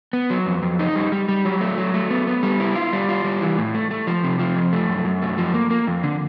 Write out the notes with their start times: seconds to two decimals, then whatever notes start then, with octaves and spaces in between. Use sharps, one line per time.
0.13 B3
0.30 F#3
0.47 F2
0.63 F2
0.79 D#4
0.95 G3
1.12 G3
1.29 G3
1.45 F#3
1.61 A3
1.78 F#3
1.94 A3
2.11 B3
2.27 B3
2.43 G3
2.60 E4
2.75 F4
2.93 G3
3.09 F4
3.24 G3
3.41 E3
3.58 A2
3.74 A3
3.91 A3
4.07 F3
4.24 C3
4.39 F3
4.56 F2
4.73 A3
4.89 F#2
5.05 F#2
5.22 A3
5.38 F3
5.54 A#3
5.70 A#3
5.87 F2
6.03 D3